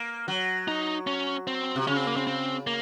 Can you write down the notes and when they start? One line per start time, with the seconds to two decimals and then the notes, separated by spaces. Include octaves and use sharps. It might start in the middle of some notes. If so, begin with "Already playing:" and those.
Already playing: A#3
0.28 F#3
0.68 D#4
1.07 C#4
1.47 C4
1.76 C3
1.87 C#3 C#4
1.97 C4
2.07 A#3
2.16 C4
2.27 C4
2.67 A#3